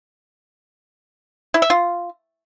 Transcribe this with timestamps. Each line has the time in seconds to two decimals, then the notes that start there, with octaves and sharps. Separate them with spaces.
1.54 E4
1.62 E5
1.70 F4